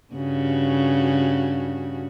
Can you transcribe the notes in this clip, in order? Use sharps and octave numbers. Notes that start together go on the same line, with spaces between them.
G2 C#3 F#4